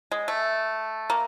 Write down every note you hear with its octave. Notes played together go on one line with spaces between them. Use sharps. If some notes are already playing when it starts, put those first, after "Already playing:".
G#3
A3
A#3